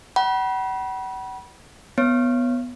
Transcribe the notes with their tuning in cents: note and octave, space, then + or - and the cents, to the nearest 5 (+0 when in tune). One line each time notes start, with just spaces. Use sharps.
F#5 +40 B5 -30
B3 +0 C#5 +0